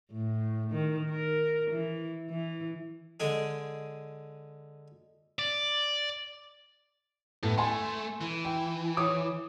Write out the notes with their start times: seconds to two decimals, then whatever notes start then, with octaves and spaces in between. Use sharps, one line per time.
0.12 A2
0.71 D#3
1.10 A#4
1.71 E3
2.30 E3
3.20 D3 G#3 G#4
5.39 D5
7.43 A2 B3
7.58 A3 G#5 C6
8.21 E3
8.45 G5
8.97 C#5 D6 D#6